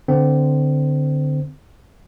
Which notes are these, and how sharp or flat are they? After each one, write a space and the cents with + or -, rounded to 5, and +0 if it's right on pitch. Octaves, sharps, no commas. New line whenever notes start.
D3 +0 C4 -25